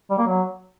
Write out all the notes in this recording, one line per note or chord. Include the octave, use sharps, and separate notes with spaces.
G3
A#3
F#3